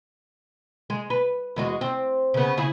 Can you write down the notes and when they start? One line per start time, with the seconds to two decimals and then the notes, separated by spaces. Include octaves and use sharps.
0.90 G#3
1.10 B4
1.56 E2 G#3 F#4
1.81 C4
2.34 C#3 B3
2.57 C#3 E4 G#4